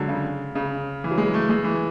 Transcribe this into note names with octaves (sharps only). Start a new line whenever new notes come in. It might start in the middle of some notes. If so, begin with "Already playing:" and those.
Already playing: D3 F#3 G#3
C#3
C#3
E3
F#3
G#3
A3
G#3
E3